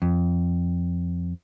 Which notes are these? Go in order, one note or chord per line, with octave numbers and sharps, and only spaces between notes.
F2